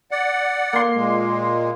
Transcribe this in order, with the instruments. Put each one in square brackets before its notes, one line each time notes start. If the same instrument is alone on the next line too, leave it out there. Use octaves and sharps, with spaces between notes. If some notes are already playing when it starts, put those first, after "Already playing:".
[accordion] D5 F#5
[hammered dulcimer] A#3 C6
[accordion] A#2 G#3